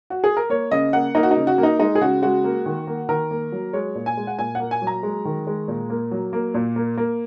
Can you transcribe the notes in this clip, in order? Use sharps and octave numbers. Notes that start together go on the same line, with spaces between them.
F#4
G#4
A#4
A#3 C#5
C#3 D#5
A#3 F#5
A#3 D#4
F#4
D#4
C#3
F#4
A#3
D#4
G#3 D#4
G#4
C#3 F#4
G#3 F#4
A#3
D#3
A#3
D#3 A#4
A#3
F#3
G#3 C#5
A#2
G#5
G#3
F#5
A#2 G#5
A#3 F#5
G#5
F#3
A#5
G#3
D#3
G#3
A#2
A#3
F#3
A#3
A#2
A#3
A#3